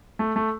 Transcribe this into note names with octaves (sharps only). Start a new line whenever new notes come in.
A3
A3